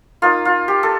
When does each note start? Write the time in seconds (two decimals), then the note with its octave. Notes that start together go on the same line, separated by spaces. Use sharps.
0.22 A#3 D#4 F4
0.45 F4
0.68 G4
0.83 A4